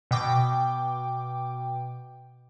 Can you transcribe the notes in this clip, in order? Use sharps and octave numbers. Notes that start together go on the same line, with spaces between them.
B2 G5 D6